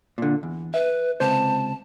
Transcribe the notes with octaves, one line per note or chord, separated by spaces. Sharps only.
A#2 D3
E2
B4 E5
C#2 C3 C5 A5